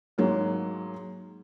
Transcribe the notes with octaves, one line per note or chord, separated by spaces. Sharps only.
G#2 F#3 G#3 A#3